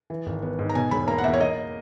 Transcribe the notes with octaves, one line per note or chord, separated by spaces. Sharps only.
E3
G#1
B3
G#2
A#5
B2 G#5
E1 B5
A#3 A#5
F#5
E2 E5
C#5
A#3 D#5